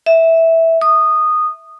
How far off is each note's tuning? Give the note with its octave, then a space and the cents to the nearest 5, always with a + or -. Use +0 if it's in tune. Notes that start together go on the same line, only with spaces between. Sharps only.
E5 -10
D#6 -15